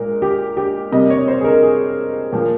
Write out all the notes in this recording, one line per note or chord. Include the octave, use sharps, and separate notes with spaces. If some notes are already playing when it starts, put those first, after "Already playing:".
Already playing: A#2 G#3 A#4
G4
G4
C3 G3 A#3 D#5
C#5
C5
G#4
A#4
G#4
A#2 F3 A#3